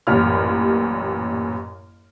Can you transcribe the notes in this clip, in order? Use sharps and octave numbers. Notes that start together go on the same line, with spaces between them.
A1 F#2 A#2 G3 G4 F6